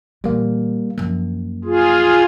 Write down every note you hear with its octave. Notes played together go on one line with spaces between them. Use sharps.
A#2 E3 G3 A#3
F#2 F3 A#3
F4 G#4